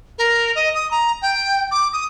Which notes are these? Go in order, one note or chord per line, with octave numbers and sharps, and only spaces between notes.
A#4
D#5
D#6
A#5
G5
D6
D#6